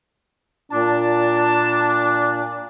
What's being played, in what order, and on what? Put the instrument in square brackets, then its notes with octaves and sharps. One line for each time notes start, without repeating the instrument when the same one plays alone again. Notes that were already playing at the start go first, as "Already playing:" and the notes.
[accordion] A#2 [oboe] D4 [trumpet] A5